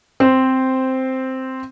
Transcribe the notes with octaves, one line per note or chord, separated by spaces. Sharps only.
C4 C5